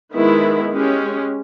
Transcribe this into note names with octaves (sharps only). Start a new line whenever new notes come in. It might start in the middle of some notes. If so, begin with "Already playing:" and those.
D#3 G#3 B3 E4
G#3 C#4 G4